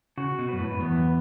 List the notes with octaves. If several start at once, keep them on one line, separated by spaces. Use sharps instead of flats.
C#3 F#4
B2
F#2 B4
A2
F#2
E2 B3